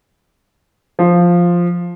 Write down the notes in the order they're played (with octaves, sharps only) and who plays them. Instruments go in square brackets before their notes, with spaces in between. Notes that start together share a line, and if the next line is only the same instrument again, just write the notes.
[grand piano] F3